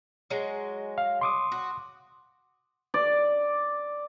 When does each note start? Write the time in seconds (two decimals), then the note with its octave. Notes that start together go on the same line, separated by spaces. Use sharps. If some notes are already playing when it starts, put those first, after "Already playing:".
0.30 F#3 G#3
0.98 F5
1.21 C6 D6 D#6
1.52 F#4
2.94 D5